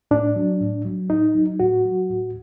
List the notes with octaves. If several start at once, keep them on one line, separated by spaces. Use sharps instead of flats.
A2 D4
F#3
A2
F#3
A2 D#4
F#3
A2 F#4
F#3
A2